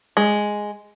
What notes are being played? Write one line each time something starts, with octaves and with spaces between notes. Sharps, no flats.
G#3